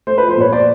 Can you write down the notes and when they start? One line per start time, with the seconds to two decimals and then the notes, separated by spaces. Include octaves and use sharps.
0.07 A3 C5
0.18 B4
0.22 F3
0.30 C5
0.37 A#2 B4 C#5
0.52 C5 D5